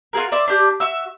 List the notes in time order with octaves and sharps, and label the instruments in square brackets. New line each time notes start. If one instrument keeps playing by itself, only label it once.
[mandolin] F4 F#4 G#4 A#4
D5 E5 C6
D4 G4
F#4 E5 E6